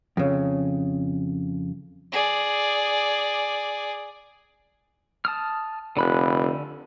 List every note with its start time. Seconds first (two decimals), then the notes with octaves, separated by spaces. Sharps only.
0.17 F2 C#3
2.12 G#4 D5
5.25 A5 D#6 F6
5.97 F1 D3 B5 F#6